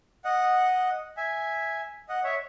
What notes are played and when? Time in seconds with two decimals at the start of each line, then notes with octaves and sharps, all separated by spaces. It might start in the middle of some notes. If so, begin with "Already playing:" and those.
0.24 D#5 F#5
1.17 E5 G#5
2.09 D#5 F#5
2.24 C#5 E5